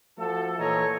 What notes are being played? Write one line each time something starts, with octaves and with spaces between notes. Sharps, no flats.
F3 A3 F#4 A4
A#2 E3 A4 C#5 D#5 A#5